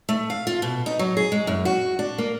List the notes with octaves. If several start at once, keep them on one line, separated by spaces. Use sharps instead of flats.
A3
F5
F4
B2
D#4
F#3
G#4
G#3
F#2
F#4
D4
A#3